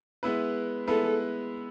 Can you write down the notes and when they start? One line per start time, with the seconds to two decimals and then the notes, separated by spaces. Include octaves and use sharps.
0.23 G#3 B3 E4 B4
0.88 G#3 B3 E4 A4 B4